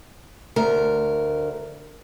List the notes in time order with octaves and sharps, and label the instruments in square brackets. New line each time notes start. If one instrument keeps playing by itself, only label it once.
[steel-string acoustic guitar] D2 A#4